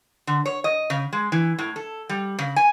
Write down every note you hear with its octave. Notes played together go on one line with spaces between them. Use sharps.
D3
C#5
D#5
C#3
G#3
E3
A2
A4
G3
C#3
G#5